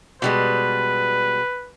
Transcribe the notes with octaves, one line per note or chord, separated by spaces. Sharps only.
B2 G3 G#3 B4